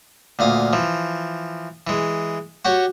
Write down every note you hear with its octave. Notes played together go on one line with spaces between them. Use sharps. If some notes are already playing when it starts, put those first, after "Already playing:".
D2 A#2 F5 D#6
E3 F3
E3 G#3
F#4 G4 C#5